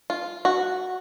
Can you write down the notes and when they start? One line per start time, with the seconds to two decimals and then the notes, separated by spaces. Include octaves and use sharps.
0.10 F4
0.45 F#4